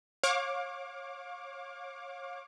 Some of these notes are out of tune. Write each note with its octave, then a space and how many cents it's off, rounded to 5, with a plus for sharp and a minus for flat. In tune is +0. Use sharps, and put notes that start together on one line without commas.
C#5 -25 F5 +30 D6 +0